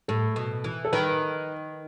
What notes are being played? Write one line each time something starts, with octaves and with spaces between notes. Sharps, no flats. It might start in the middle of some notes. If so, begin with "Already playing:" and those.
A2 A4
B2
E3
A4
D#3 B4